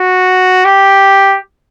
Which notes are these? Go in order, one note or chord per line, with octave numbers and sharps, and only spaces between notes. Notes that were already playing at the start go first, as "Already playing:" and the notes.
Already playing: F#4
G4